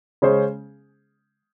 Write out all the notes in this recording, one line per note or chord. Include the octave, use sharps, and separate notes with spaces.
C#3 G#3 C#4 G#4 C5